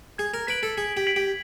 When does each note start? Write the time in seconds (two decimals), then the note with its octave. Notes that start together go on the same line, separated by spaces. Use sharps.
0.18 G#4 G#6
0.34 A#4
0.47 B4 B6 D7 F#7
0.63 A4
0.77 G#4 G#6
0.97 G4
1.07 B6 D7 F#7
1.16 G4